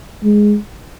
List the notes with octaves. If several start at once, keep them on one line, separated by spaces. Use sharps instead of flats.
G#3